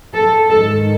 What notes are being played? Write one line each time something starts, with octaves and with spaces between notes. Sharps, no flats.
A4
G#2 D#3 A4